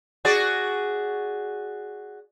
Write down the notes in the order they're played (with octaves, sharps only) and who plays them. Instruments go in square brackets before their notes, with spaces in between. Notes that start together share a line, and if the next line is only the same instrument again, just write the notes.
[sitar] F#4 G#4 D5